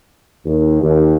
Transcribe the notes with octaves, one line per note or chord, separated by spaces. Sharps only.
D#2
D#2